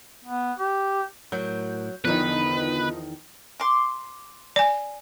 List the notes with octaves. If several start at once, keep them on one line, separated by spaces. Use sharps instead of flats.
B3
G4
A2 F#3 A#4 G6
E2 D3 D#3 F3 B3 D#4 B4
C6 D6
D5 G#5